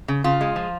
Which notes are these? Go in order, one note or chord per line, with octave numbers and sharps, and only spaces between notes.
C#3
C#3 F4
G#3
F3